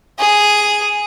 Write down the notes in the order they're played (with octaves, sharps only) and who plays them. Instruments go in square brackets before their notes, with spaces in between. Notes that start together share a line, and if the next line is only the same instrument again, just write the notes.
[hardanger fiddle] G#4